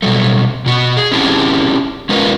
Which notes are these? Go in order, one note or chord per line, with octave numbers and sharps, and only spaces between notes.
B2 F#3 G3 A3
B2 F#4
G#4
C4 C#4 E4 G4 G#4 A5
G#3 C#4 D#4 F4 A#4 B4